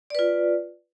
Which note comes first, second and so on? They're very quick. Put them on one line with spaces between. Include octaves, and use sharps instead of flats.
D5 B4 F4